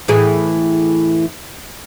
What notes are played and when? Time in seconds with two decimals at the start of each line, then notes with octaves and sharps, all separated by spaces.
0.08 A2 E3 G#4